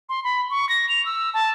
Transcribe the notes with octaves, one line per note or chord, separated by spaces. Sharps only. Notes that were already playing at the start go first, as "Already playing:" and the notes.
C6
B5
C#6
A#6
F7
E6
A5